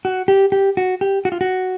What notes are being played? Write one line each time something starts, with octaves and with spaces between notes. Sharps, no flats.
F#4
G4
G4
F#4
G4
F#4
F4
F#4